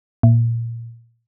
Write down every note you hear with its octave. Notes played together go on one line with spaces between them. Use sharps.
A#2